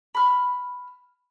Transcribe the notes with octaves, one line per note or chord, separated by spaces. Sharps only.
B5 F6